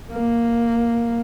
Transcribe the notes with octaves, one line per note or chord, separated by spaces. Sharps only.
A#3